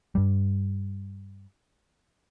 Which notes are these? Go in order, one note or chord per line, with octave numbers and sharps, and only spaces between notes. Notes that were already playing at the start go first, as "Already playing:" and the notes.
G2 G3